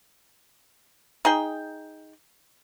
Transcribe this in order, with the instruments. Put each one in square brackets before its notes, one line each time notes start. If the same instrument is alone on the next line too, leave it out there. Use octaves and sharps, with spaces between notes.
[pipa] D#4 G#4 G5